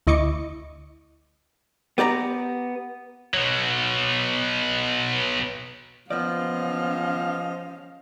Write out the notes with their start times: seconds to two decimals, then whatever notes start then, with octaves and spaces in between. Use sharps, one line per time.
0.07 D2 E4 D#5 C#6 D6 C#7
1.98 B3 G4 D5 A#5
3.34 B2 F#3
6.11 F3 B3 C#4 D5 D#5 F5